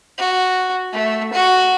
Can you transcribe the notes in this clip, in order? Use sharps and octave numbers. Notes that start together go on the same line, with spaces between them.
F#4
A3
F#4